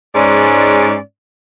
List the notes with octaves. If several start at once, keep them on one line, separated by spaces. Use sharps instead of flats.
G#2 G#3 C#4 D5